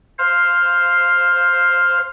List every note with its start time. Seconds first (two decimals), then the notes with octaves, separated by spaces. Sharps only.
0.18 C5 F5